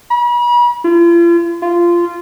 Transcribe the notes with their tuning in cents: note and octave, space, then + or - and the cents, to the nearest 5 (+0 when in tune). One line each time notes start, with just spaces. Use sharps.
B5 -40
F4 -40
F4 -15